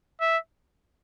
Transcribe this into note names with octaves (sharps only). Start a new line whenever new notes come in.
E5